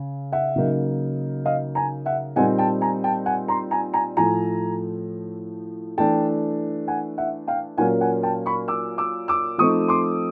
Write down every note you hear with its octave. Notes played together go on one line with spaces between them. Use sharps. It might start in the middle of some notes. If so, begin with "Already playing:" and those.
Already playing: C#3
E5 F#5
C#3 F#3 A#3 D#4
D#5 F5
G#5 A#5
E5 F#5
A#2 G3 C4 D#4 F#5 G#5
G5 A5
G#5 A#5
G5 A5
F#5 G#5
A#5 C6
G#5 A#5
G#5 A#5
A2 F3 A3 G#5 A#5
E3 A3 D4 G5 A5
F#5 G#5
E5 F#5
F5 G5
A#2 F#3 A#3 C#4 F#5 G#5
F#5 G#5
G5 A5
B5 C#6
D6 E6
D6 E6
D6 E6
F3 A3 C4 D#4 C#6 D#6
C6 D6